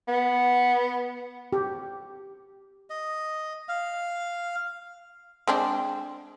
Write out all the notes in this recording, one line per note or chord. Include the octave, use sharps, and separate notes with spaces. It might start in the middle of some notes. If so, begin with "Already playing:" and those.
B3
G4
D#5
F5
G#3 C4 D4